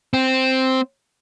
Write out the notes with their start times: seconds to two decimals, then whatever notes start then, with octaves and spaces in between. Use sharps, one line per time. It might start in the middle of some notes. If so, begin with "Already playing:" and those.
0.14 C4